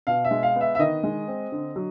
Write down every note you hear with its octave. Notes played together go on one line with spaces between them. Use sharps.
B2 F5
E5
G#3
F5
B3
E5
E5
D#3 D#5
G#3
C4
D3
F#3